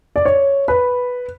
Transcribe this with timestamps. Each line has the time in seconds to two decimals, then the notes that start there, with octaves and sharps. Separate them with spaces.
0.16 D5
0.25 C#5
0.68 B4